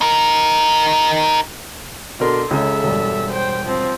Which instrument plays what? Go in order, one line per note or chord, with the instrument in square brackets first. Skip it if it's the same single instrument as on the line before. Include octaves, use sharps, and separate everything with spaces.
[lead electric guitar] D#4 A#4
[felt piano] B2 A#4 [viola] D3 C6
[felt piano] C#2 C#3 G#3 [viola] A4 E5
[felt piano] E1 G2
[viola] C5 G5
F3 C4